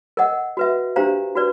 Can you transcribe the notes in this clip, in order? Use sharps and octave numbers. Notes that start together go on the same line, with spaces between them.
A#4 D#5 F#5
F#4 B4 E5
D4 G4 C5 F5 A#5
F#4 B4 D5